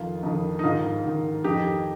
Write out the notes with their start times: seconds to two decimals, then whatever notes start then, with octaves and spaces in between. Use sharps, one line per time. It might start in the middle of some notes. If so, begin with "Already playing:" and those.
Already playing: F2 D#3 F4
0.23 F2 D#3
0.59 D#4
0.64 G#2 D#3 F4
1.04 G#2 D#3
1.44 F2 D#3 D#4 G4